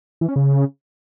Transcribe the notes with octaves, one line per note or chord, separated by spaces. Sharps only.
E3
C#4
C#3